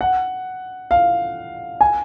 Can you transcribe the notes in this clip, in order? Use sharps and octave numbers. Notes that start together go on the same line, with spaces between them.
F#5
F5
G#5